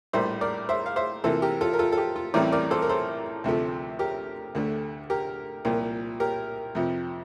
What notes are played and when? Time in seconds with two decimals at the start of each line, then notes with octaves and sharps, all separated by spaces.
0.13 A#1 A2 G3 A#3 C5 E5
0.41 A#4 D5
0.69 C5 E5
0.86 F5
0.96 C5 E5
1.24 C3 E3 A#3 F4 A4 C5
1.42 G4 A#4
1.61 F4 A4
1.73 A#4
1.79 F4 A4
1.92 A4
1.97 G4
2.16 F4
2.34 A1 A2 E3 G3 C4 A#4 D5
2.52 A#4 D5
2.71 A4 C5
2.82 A#4
2.89 A4 C5
3.44 D2 C3 F3 A3
3.99 G4 A#4
4.55 D2 D3 A3
5.10 G4 A#4
5.65 C2 A#2 F3 A#3
6.20 G4 A#4
6.75 F2 C3 F3